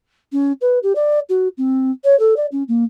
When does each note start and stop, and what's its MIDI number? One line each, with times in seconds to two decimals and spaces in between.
0.32 0.52 61
0.61 0.79 71
0.83 0.92 67
0.95 1.19 74
1.29 1.48 66
1.58 1.91 60
2.04 2.17 73
2.19 2.34 69
2.36 2.46 74
2.52 2.63 61
2.68 2.84 58